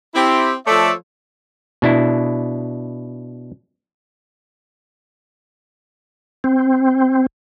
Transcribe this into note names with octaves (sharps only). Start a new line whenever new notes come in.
C4 E4 G4
F3 A3 A4 C#5 D5 E5
B2 D4 E4
C4